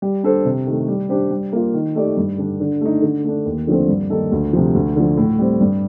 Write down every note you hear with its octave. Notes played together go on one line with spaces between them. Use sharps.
G3
D4 A4 C5
C3
D#3 A3
G3
D4 G4 C5
G3
A#3 F4
D#3
A3 D#4 G4 D5
G2
D3 G3 D4
D3
A3 D#4
D3
A3 D4
D#2
D3 F3 A3 C4
G2
D#3 A#3 D#4 A4
D2
C3 F3
D2
D3 F3
A2
G3 C4
G2